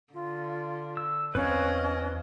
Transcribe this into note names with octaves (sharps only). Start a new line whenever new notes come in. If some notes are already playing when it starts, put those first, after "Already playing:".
D3 F4
E6
E2 C4 C#4 B4 D#5 F5